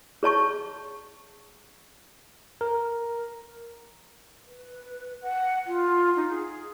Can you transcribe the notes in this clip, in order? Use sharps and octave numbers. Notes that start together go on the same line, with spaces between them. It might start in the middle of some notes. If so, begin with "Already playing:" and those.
G#4 C#5 A5 C#6
A#4
B4
F#5
F4
D#4
G#4